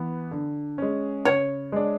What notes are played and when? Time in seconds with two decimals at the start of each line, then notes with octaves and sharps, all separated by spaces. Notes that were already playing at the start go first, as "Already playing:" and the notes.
Already playing: E3 B3
0.31 D3
0.78 G#3 C#4
1.25 C#3 C#5
1.72 G#3 D4